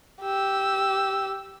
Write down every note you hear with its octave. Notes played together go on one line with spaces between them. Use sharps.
G4 E6